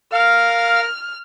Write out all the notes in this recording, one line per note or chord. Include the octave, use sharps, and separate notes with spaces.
A#4 F5 F6